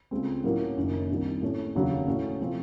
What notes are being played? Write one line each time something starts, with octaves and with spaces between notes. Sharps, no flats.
C#2 C#3 A3 C4
A2 F#3 A#3 C#4 F4
F#1 F#2 D#3 A#3
C2 C3 D#3
A2 A3 C#4
F1 D#2 C#3 F#3
A2 A3 C#4 F#4
C3 F3 A3 C4